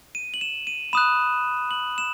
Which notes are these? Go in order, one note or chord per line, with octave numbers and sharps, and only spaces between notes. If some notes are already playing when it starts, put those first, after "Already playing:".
D#7
F#7
E7
D#7
B5 D#6 F#6 E7
F#7
E7